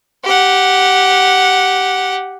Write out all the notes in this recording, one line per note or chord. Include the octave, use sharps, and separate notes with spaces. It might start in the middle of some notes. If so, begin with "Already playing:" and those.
G4 F#5